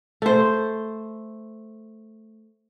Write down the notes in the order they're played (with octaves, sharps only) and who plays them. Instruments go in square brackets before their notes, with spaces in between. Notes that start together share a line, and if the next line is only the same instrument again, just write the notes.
[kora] A3 C5